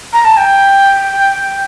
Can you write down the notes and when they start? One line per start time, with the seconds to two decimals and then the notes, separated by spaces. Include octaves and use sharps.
0.13 A#5
0.25 A5
0.37 G5